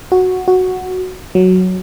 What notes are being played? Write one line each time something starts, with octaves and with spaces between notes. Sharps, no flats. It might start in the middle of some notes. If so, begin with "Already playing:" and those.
F#4
F#4
F#3